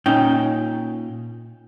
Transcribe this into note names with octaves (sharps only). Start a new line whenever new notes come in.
A#2 C#4 D#4 G5